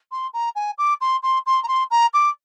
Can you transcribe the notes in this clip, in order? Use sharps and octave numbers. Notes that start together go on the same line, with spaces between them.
C6
A#5
G#5
D6
C6
C6
C6
A#5
C6
A#5
D6